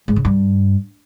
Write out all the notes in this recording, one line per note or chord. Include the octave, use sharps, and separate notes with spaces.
G#2
C#3
G2